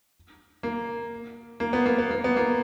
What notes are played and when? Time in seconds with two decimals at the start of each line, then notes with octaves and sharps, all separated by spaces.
0.63 A#3
1.60 A#3
1.73 B3
1.86 A#3
1.98 B3
2.11 A#3
2.24 B3
2.37 A#3